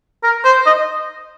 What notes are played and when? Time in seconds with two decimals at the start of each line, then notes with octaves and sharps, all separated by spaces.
0.23 A#4
0.45 C5
0.66 D#5